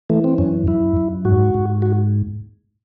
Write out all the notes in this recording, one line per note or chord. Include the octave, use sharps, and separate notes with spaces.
E3 A3
C4
F#2 C#4
F#2 E4
F#2
G#2 F#4
G#2
F#4